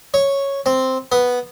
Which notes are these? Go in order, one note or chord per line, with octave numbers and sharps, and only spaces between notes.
C#5
C4
B3